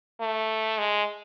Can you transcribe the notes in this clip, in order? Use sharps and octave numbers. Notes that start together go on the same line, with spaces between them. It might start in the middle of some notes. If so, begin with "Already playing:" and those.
A3
G#3